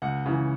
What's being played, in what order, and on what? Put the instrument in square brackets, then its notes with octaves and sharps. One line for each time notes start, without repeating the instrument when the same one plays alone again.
[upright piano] C#2 F#5
C#3 E3